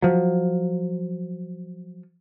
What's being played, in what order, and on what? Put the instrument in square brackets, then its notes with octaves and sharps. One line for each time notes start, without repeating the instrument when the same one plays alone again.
[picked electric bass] F3 F#3